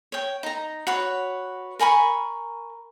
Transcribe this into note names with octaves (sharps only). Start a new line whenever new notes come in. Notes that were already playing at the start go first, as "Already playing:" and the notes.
C#5 G5
D#4 A#5
F#4 B4 C#5
A#4 G#5 B5 C#6